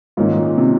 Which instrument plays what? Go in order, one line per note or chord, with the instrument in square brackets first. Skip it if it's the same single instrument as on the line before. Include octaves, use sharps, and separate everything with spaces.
[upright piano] G#2 [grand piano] D#3 A#3 C#4 F4
[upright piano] A#2
C3